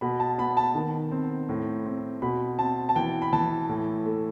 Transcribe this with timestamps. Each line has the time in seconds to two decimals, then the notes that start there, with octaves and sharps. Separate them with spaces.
0.01 B2 B5
0.20 A5
0.38 B3 B5
0.57 A5
0.75 D#3
1.12 C4
1.49 A2
1.86 C4
2.22 B2 B5
2.58 C4 A5
2.89 A5
2.96 E3 G5
3.22 B5
3.33 E3 A5
3.69 A2
4.05 A3